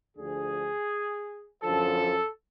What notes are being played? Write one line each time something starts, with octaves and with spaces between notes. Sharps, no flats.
D2 D3 F3 G#4
F#2 D3 F3 A4